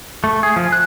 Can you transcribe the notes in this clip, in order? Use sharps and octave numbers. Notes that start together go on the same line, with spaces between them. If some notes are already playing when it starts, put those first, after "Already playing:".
A3
G#4
F3
F#6